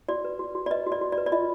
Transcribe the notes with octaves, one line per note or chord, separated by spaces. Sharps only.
F#4 D5
B4
F#4
F#4
D5
B4 D#5
F#4
D5
F#4
D5
B4
D5
F4 D#5